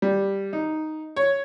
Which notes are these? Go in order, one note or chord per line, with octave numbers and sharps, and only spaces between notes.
G3
D#4
C#5